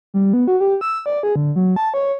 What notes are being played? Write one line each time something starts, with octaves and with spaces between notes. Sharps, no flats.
G3
B3
F#4
G4
E6
D5
G#4
D3
F#3
A5
C#5